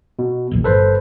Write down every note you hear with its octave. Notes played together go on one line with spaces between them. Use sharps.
B2
E1 A#1 E3
G1 A4 B4 C5